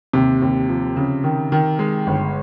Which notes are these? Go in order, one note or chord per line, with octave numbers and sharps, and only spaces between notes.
D#2 C3
D#2
F3
C#3
D#3
D#3
G#3
G1